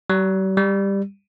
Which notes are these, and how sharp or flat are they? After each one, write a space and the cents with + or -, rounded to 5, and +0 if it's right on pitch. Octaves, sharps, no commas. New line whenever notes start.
G3 -45
G3 +10